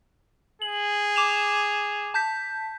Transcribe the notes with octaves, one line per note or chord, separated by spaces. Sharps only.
G#4 F#7
D6 E7 F7
A5 G6 B6